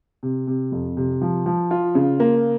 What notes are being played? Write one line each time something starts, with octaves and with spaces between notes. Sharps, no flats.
C3
C3
F2
C3
F3
F3
F4
C#3
A#3